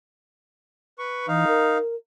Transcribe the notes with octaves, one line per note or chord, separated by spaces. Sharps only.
B4 C#6
E3 D#4 F5
A#4